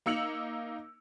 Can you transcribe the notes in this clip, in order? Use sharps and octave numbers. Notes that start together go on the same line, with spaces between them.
A#3 D#4 E6 C#7 F7 F#7